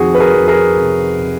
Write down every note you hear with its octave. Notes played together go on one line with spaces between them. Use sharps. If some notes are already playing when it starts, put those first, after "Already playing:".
Already playing: F2 C3 D#3 F#4 G#4
B4
G#4 A#4
F2
G#4 A#4
C3
C3